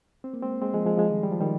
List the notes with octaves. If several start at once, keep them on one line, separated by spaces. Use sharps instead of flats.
C4
A#3
G#3 C4
G#3 C4
F3 G#3
F3 G#3
F3 G#3
D#3 G3
G3
F3
D#3 G3